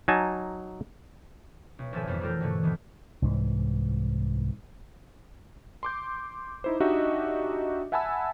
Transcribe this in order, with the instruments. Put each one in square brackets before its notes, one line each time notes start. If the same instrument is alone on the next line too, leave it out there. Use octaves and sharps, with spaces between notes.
[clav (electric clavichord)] F#3 D#4 G#5 A5
[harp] B1
G#1 F3 G3 A4 E5 G#5
F2 E3 G3 B3 E4
A3 E4 F4 G4 A4 A#4
G2 B2 D3 E3 A3 F#4
D#2 D#3 E3 B3
[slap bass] C2 G#2 E3
[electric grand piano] C6 D6 G6
D#4 E4 C5
D4 D#4 F#4 G4 D#5 E5
E5 F#5 G#5 A5 B5 E6